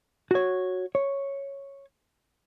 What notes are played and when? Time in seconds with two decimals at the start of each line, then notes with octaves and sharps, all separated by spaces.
0.31 F#4 C#5
0.95 C#5